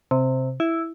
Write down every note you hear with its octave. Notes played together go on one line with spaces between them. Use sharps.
C3
E4